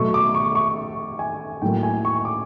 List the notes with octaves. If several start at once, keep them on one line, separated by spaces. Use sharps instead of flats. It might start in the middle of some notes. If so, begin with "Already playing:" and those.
Already playing: B2 F#3 A3 C#6
D6
C#6
C#6
G#5
A2 F#3 A#3 G5
G#5
C#6
D6